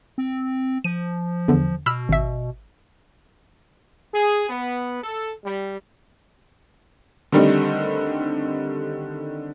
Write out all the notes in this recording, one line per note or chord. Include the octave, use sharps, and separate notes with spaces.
C4
F3 D#7
E2 D3
B2 B5 E6 F6
G#1 E5
G#4
B3
A4
G3
D3 D#3 G3 A3 C4 D#4